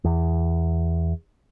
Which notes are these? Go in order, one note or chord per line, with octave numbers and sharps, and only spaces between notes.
E2